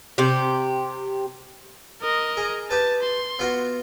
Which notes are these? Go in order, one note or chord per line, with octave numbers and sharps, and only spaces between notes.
C3 G4
A#4 D#5
G#4
G4 B4 A5
C6
B3 F4 F#4